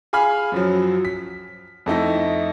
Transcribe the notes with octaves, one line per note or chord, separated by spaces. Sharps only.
G#4 F5 G#5 B5 F6
F#2 F3 F#3
B6
F2 A3 D#4 E4